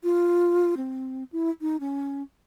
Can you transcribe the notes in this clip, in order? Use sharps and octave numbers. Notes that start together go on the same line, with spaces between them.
F4
C4
E4
D#4
C#4